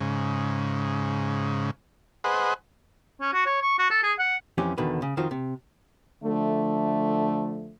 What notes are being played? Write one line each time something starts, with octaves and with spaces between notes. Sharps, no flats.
G#2 C#3
G#4 B4 C5 D#5 F#5
C#4
F#4
C#5
C#6
F#4
A4
G#4
F#5
F2 E3 C#4 G4
E2 B2 D3 D#3 B4
C#3
F2 D#3 F4 F#4 C5
C3
D3 F3 A3